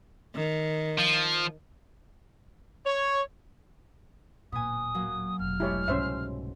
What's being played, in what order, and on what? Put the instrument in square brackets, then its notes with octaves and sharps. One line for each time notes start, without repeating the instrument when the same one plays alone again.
[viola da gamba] D#3
[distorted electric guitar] F3
[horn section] C#5
[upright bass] D1 A#2 [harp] B3 G#5 [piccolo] D#6
[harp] F#3 A#3
[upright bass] F1 B1 [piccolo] F6
[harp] G#3 A3 [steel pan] E4 G4 C#5
[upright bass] C2 G#2 [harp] B2 [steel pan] C#4 C5 E5